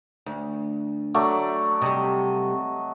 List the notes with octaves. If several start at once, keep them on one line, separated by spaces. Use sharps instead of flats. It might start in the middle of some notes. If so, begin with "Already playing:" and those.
D2
F#3 A3 D5
C3 G3 D#5